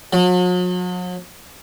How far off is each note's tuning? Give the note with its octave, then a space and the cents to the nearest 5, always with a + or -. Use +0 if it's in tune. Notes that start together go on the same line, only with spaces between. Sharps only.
F#3 -45